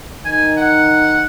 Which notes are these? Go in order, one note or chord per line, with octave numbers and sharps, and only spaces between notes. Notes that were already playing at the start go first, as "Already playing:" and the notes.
D#3 G#5
F#5